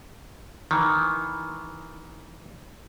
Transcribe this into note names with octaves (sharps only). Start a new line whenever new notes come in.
D#3 E3